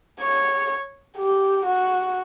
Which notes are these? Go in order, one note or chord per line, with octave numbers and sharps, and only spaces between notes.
C#5
G4
F#4